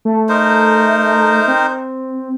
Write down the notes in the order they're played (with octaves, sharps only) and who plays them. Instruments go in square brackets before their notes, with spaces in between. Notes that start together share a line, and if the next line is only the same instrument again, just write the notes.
[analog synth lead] A3
[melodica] D#4 A#4 C5
[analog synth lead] C4